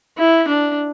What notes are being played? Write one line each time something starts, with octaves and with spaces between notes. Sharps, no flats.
E4
D4